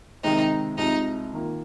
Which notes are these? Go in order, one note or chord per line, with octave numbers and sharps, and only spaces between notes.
C3 D#3 G#3 C4 D#4 G4
C2 C3 F3 G#3 D#4
D#3 A#3 F4